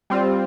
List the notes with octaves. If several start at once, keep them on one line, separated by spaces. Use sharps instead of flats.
G3 C4 F4